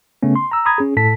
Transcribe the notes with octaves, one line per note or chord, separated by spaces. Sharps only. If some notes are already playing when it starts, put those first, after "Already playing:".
C#3 A3 B3 C#4
C6
A#5 E6
A#5 B5 D#6 G#6
C#4 G#4
A2 A4 A5 B6